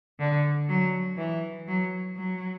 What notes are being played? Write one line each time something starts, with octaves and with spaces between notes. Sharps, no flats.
D3
F#3
E3
F#3
F#3